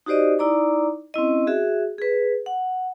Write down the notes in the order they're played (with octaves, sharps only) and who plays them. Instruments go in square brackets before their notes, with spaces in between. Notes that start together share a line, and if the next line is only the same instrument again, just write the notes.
[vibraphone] D#4 F#4 G4 C5 D5 D#5
D#4 E4 D5 A#5 D6
C4 C#4 E4 D#5
F#4 G#4 E5
G#4 B4
F#5